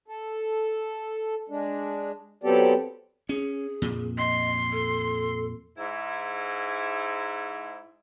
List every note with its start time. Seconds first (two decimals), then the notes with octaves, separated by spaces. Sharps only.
0.08 A4
1.49 G#3 D4
2.44 F#3 B3 C4 G4 A4 D5
3.29 C#4 G#4
3.82 F2 A#2
4.18 D#5 C6
4.72 A4
5.78 G#2 E4